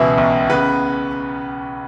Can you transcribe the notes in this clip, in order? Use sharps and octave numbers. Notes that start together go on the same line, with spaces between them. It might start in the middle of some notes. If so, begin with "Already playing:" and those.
Already playing: C#2 B2 E3 E4
B1
C#3 B3 B4